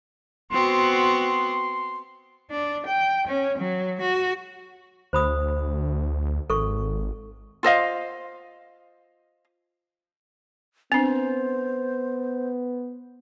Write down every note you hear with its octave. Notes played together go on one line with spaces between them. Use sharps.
B3 C4 F#4 C6
D4
G5
C#4
F#3
F#4
D2 C5 B5 D#6
G#1 A4 C#6
F4 C5 D#5 F5
B3 C4 D4 C5